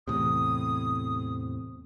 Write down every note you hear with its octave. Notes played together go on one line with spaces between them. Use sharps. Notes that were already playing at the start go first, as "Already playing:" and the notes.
E2 A2 C3 D#6